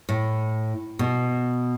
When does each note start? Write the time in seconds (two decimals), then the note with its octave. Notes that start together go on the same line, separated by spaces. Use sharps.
0.09 A2
0.99 B2